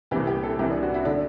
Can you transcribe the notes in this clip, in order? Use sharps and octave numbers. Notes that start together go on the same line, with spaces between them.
C2 C3 E3 G4
G4
A4
C2 C3 E3 G4
D4
F#4
E4
D3 D4